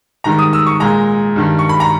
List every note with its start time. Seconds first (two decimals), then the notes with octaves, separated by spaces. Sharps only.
0.24 G#2 D#3 G3 A#5
0.39 D#6
0.53 E6
0.66 C#6
0.80 A#2 G#3 A#5
1.36 G2 D#3 G3
1.59 C#6
1.69 B5
1.80 A#5